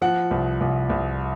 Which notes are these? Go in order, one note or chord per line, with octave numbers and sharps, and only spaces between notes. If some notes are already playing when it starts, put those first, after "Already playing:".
F3 F#5
C2
C2
C2